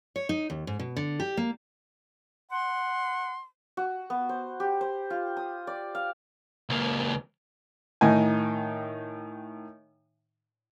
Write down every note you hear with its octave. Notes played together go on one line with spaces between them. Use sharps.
C#5
D#4
D#2
G#2
B2
D3
G4
A#3
F#5 C6
F#4
B3
C5
G4
C5
F4
D#6
D5
F5
C#2 A#3
A2 D#3 D#4 G#5